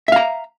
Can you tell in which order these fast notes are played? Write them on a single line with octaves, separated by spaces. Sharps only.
E5 F5 A#5